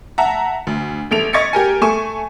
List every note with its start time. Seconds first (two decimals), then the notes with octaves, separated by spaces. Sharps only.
0.18 E5 F#5 A5 A#5
0.67 D2
1.11 A1 A3 D7 F7
1.33 D#5 C#6 G#6 A6 B6 C#7
1.53 G4 A#4 G#5
1.81 A3 G#5 C#6 E7